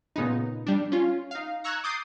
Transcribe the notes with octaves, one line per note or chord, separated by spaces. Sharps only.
A#2 C#3 B3 D#4
G3 D4
C#4 F4
D#4 F5
A#5 C#6 E6 F#6 G#6
D6 D#6 G6 A6 C7